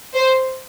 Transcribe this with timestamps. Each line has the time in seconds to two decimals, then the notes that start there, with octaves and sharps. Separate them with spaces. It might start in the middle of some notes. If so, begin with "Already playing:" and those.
0.15 C5